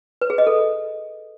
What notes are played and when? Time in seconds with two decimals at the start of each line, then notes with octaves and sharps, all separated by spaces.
0.21 B4
0.30 G#4
0.38 D#5
0.47 A4